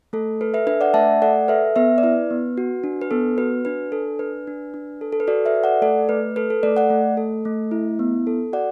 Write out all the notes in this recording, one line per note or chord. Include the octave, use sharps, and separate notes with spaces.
A3 A4
A4 B4
B4 E5
D4 B4 E5
D5 F#5
A3 E5 A5
A4 D5 F#5
A4 B4 E5
B3 B4 E5
D5
E4 B4
B3
F#4
D4
B4
B3 A4
F#4 B4
D4 B4
D4 A4
D4 B4
D4
D4
A4
A4
B4
F#4 A4 D5
B4 E5
A4
D5 F#5
A3 A4 D5
A3 B4
A4 B4
A4
A3 A4 D5
D5 F#5
A3
A4
A3
E4
B3
A4
F#4 D5 F#5